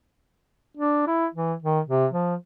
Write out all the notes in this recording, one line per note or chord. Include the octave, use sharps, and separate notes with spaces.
D4
E4
E3
D#3
C3
F3